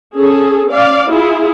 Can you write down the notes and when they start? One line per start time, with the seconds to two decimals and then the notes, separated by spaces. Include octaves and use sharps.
0.16 C#4 G#4 A4
0.70 C#4 D5 F5
1.11 E4 F4 G#4